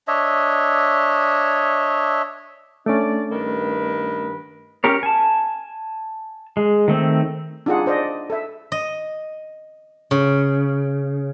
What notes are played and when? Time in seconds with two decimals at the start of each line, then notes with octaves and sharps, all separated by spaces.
0.08 D4 C#5 D#5 E5
2.86 A3 C#4 D4 D5
3.31 G2 D#3 B4
4.84 C#4 G4 A#4 C#5
5.03 G#5 A5
6.57 G#3
6.88 D#3 A3 C4
7.66 D4 D#4 F4 G4 G#4 F#5
7.86 D4 C5 D5 D#5
8.30 A4 E5
8.72 D#5
10.11 C#3